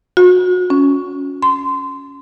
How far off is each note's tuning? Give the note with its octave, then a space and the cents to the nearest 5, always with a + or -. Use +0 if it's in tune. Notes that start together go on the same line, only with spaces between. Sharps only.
F#4 -30
C#4 +10
C6 -25